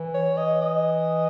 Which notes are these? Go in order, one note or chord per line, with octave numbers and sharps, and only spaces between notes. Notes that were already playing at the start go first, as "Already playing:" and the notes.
Already playing: E3
C#5
D#5
D#5